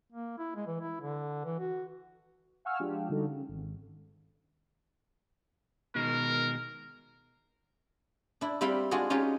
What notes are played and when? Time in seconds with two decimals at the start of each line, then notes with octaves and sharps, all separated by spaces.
0.12 A#3
0.38 E4
0.56 G#3
0.67 E3
0.81 E4
1.01 D3
1.45 E3
1.60 F#4
2.65 F5 F#5 G#5 C#6 E6 F6
2.79 F3 G#3 D4 F4 G4
3.09 D3 G3 D4 D#4 F#4 A4
3.28 C#3
3.49 G#1
5.95 B2 D#3 G#3 A#4
8.41 D4 E4
8.61 G3 C4 E4 F5 G5 B5
8.91 G#3 D4 F4 F#4 G#4
9.10 C#4 D#4 F4 G4 G#4